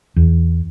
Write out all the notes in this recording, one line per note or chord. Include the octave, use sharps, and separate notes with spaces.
E2